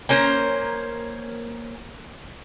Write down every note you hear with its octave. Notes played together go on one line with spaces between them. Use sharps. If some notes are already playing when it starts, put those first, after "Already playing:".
A#3 C#4 A#4 C5